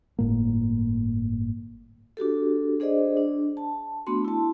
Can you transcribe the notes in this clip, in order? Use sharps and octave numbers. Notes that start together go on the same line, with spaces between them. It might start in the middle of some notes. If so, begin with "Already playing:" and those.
G1 A2 A#3
D4 F#4 G4 A4
D4 G#4 C5 D5 D#5
D4
A5
A3 B3 D4 F#4 C6
E4 A5